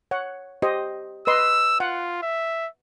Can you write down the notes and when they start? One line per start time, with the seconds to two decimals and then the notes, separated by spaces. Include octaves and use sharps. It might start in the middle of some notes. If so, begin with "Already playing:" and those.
0.11 C#5 F#5
0.62 G4 C5 D#5
1.27 B4 D#5 C6 E6
1.80 F4 F#5
2.23 E5